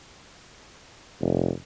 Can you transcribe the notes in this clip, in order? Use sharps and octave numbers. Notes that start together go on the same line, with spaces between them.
F1